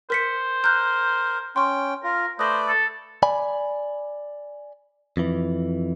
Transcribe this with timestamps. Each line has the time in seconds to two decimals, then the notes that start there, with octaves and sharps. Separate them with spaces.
0.10 A#4 C5 B6 C#7
0.64 A#4 F#6 G6
1.56 C#4 G5 C6 C#6
2.04 F4 A#4
2.39 A3 B4 C5 D5 D#6 A#6
2.68 A4
3.23 D5 G#5 B5
5.17 F2 E3